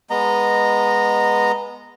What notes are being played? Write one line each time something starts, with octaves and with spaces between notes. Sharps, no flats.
G#3 B3 D#5 A#5